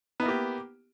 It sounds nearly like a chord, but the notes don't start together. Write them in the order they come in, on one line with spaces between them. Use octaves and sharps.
B3 E4 A#3 G4